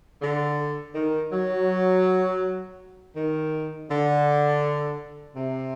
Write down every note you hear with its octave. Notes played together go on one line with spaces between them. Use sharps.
D3
D#3
F#3
D#3
D3
C3